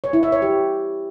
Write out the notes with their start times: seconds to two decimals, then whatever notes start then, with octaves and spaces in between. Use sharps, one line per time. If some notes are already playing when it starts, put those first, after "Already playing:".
0.04 C#5
0.13 E4
0.23 E5
0.32 C#5
0.42 G4